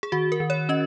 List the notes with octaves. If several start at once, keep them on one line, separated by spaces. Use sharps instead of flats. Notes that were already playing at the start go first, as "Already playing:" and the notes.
G#4
D#3 F#4
A#4
D#3
C#5
C#4 D#5